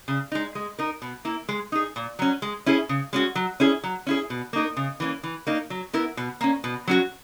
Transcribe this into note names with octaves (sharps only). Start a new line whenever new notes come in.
C#3
G#3 D#4
G#3
D#4 A#4
B2
A#3 E4
G#3
D#4 G#4
A#2
F#3 C#4
G#3
C#4 E4 G#4
C#3
G#3 C#4 F#4
F#3
C#4 E4 G#4
F#3
C#4 E4 G#4
B2
A#3 D#4 A#4
C#3
E3 A#3 C#4
E3
A#3 D#4
F#3
B3 E4 A#4
B2
A#3 C#4
B2
F#3 C#4 F#4